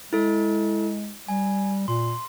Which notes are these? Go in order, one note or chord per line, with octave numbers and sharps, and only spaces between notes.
G#3 E4 A4
G3 G#5
A#2 C6